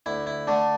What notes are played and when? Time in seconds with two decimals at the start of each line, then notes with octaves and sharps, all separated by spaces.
0.06 D2 E4
0.27 E4
0.47 D3 A3 D4